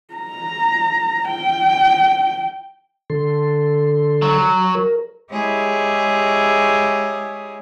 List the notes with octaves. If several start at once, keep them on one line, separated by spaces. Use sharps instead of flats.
A#5
G5
D3 A4 C6
F#3
A#4
G#3 E4 G4 G#4 C#5